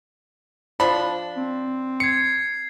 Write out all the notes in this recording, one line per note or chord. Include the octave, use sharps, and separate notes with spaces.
F3 D4 B5
C4
G#6 C7 C#7